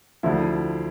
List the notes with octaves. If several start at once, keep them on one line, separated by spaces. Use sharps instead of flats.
D2 D3 F3 E4